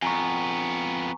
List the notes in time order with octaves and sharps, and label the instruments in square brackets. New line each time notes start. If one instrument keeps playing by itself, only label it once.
[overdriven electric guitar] F2 B3 [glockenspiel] G#5 A#5 C#6